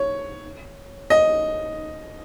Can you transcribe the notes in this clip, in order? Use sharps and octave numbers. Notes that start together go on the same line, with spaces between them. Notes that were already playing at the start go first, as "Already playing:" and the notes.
Already playing: C#5
D#5